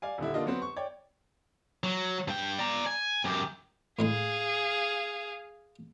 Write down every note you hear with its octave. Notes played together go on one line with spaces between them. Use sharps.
D5 F5 G#5
D#1 D3 E4
D3 A#3 D4 F4 D#5
F#3 B3 C4
C#6
C#5 D5 G5
F#3
G2 G5
D5 A#5
G#5
F#2 G4
A2 G#3 D#4 G#4 F5